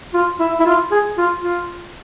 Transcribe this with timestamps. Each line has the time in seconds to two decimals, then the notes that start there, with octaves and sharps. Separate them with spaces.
0.14 F4
0.40 E4
0.60 E4
0.66 F4
0.91 G#4
1.18 F4
1.43 F4